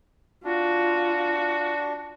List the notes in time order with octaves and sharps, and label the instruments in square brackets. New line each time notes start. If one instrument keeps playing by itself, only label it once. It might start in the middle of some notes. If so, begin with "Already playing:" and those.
[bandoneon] D4 [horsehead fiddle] F4 [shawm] F#4